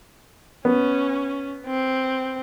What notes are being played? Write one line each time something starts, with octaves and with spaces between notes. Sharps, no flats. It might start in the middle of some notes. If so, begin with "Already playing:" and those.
B3 C#4
C4